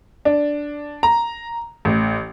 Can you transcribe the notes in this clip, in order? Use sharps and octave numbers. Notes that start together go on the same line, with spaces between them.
D4
A#5
A1